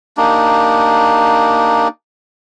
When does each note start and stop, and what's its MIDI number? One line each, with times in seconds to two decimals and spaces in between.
0.17 1.88 58
0.17 1.88 62
0.17 1.88 63
0.17 1.88 67